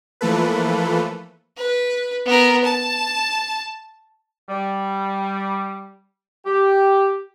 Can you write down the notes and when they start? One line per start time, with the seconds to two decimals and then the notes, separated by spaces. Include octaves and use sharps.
0.21 E3 F3 A3 A#3 A4 B4
1.57 B4
2.26 B3 A#4
2.64 A5
4.49 G3
6.46 G4